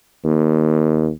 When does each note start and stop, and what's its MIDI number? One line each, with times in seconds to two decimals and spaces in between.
0.24 1.09 39